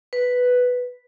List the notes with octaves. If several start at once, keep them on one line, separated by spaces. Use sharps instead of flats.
B4